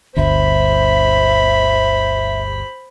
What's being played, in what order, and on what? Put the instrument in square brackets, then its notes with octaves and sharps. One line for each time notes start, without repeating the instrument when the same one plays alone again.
[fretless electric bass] G1 D2 [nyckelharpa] C5 B5 [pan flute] E5